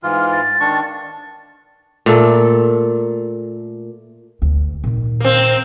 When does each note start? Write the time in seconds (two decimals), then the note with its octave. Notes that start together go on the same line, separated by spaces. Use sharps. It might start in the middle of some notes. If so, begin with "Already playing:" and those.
0.03 G#2 E3 F4 F6
0.32 A6
0.60 D#3 D4 C#6
2.06 A#2 A3 A4
4.42 D2
4.84 A#2 D#3
5.20 A#3 C4